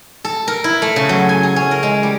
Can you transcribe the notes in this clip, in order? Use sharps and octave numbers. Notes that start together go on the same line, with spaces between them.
A4
A#4
E4
A3
C#3
F#3
G#5
G#4
C#4
A#4
G#3
G3